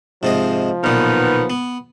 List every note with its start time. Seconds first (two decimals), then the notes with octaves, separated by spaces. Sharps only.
0.23 G#2 C3 F3 D#5
0.84 B1 A#2 D#3 B3
1.50 B3